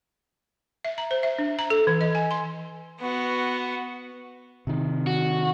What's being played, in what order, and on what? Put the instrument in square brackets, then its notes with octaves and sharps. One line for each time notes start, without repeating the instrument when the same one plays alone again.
[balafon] E5
A#5
C5
E5
D4
A#5
A4
E3
D#5
G#5
C6
[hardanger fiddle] B3 F#4
[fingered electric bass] C3 D#3
[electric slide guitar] F#4